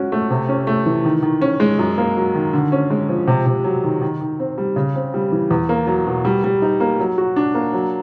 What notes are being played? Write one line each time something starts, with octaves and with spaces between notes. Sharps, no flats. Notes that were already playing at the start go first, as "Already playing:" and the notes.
Already playing: F#3 G#3 C#4 F#4
A3
C3
C#4
A3
E3
D#3
D#3
C#4
G#3
F#2
A#3
F#3
D#3
D3
C#4
G#3
F3
C3
C3
F#3
D#3
D#3
D#3
C4
G3
C#3
C4
G3
E3
E2
A#3
F#3
B2
G3
G3
D#4
A#3
F#3
F#4
D4
A#3
F#3